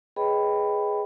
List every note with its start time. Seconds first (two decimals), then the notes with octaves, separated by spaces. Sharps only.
0.16 G#4 B4 C#5 D#5 G5 B5